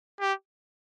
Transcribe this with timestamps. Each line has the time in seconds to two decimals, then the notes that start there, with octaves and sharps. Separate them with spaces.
0.20 G4